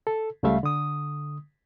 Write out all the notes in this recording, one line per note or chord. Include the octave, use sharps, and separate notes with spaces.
A4
C#2 C#3 G3 A3 E5 F5
D3 D#6